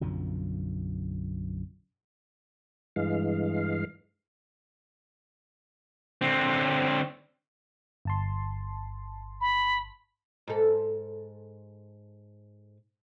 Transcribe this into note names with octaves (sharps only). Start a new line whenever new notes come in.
B1 F#2 D3 F3
G2 E3 G#3 F5
D3 C4
G1 A5 C6
B5
G#2 A4